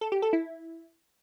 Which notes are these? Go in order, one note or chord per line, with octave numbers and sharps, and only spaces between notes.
A4
G4
A4
E4